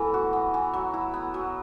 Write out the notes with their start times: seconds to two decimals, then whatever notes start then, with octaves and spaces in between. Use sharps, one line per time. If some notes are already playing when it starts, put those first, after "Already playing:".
Already playing: A2 E3 F#3 B3
0.14 F#4
0.33 B3
0.54 E3
0.74 F#3
0.94 E4
1.14 B3
1.34 F#3